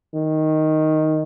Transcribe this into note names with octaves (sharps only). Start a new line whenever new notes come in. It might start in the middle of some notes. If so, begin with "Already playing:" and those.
D#3